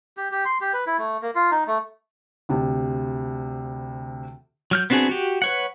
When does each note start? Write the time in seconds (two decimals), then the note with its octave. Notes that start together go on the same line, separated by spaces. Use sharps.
0.17 G4
0.32 G4
0.45 C6
0.61 G4
0.73 B4
0.87 E4
0.98 A3
1.22 A#3
1.35 F4
1.51 D#4
1.67 A3
2.49 D2 C3
4.71 F#3 F6 G6
4.90 B3 C4 D4 F#4 G#4
5.09 F#4 G4
5.42 B4 C#5 F#5